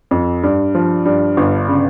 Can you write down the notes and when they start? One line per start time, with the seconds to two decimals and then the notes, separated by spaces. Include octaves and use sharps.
0.11 F2
0.43 G2
0.75 F3
1.05 G2
1.37 G1
1.68 C#3